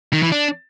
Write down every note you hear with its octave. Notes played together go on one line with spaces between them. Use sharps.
D#3
E3
D4